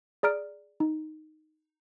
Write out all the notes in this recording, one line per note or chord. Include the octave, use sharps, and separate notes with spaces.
G#4 D5 A#5 F6 D7
D#4